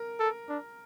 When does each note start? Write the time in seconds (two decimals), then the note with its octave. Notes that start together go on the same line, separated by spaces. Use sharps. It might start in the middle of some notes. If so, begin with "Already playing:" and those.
Already playing: A#4
0.20 A4
0.49 D4